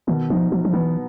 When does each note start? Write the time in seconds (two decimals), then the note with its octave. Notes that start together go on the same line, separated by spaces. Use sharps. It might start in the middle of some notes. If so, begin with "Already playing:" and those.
0.07 B2 D#3
0.30 F3 D#4
0.51 F3 F#3
0.65 F3
0.73 E3 B3